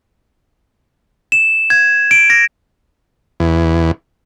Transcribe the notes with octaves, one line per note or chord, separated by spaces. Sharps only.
E7
G#6
D7
A#6
E2